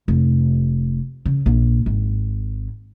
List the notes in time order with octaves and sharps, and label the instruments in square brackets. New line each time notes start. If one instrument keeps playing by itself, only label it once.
[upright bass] F1
C#3
A#1
G#1